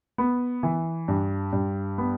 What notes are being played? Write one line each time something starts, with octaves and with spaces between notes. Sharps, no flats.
B3
E3
G2
G2
B3